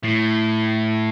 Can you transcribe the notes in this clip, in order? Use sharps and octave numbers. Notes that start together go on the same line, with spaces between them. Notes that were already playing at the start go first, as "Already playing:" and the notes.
A2